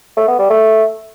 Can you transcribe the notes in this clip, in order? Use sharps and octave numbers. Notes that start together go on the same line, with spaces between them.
A3
B3
G3
A3